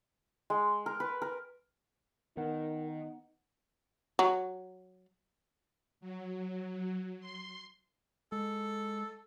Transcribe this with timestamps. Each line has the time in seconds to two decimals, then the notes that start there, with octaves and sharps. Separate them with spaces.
0.50 G#3
0.86 A#4
1.00 B4
1.22 A#4
2.37 D#3 B3 D#4 A#4 F#5
4.19 F#3
6.01 F#3
7.20 C6
8.32 G#3 A4